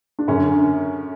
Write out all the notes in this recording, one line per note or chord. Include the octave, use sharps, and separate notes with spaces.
D4
F#2 D3 C#4